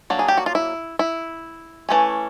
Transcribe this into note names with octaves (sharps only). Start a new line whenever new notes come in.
F#3 A#3 D4
G#4
G4
F#4
F4
E4
E4
E3 A3 C#4